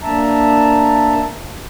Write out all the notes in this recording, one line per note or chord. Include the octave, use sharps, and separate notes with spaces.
A#3 D4 E5 A5 A#5